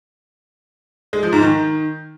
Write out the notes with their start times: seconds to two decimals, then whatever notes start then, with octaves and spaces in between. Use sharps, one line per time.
1.13 G#3
1.23 F3
1.33 G#2
1.42 D#3